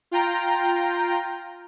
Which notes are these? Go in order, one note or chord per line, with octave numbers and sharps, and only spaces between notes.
F4 G5 A#5